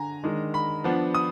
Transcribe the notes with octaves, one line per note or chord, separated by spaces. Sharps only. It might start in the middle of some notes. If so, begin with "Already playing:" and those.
Already playing: D3 G#5 A#5
D#3 G#3 D4
B5
F3 B3 D4
D#6